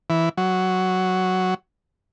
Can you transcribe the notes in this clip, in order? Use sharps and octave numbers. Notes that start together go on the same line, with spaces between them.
E3
F#3